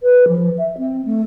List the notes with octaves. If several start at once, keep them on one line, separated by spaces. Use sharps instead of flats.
B4
F3
E5
C4
A3